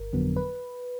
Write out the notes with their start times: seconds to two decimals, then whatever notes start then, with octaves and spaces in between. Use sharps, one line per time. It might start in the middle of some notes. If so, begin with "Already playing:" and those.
Already playing: G1 A#4
0.13 F2 D3 F#3 B3
0.36 B4